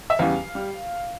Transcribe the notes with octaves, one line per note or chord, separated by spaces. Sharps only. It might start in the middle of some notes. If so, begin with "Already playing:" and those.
E5
E2 C#3 E3 G3 F5
G3